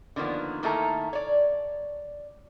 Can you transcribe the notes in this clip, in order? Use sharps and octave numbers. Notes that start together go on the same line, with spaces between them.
D3 D#3 F3 A#3 B3
D#3 A3 A#3 E4 A4 A#5
C#5 D5